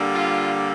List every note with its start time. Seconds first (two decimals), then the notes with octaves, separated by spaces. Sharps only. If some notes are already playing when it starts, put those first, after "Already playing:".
Already playing: D3 G3 A#3
0.15 F4